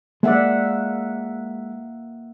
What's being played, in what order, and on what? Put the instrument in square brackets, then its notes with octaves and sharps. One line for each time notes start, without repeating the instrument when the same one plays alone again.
[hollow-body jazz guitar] G#3 D5 [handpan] A#3 E5 F#5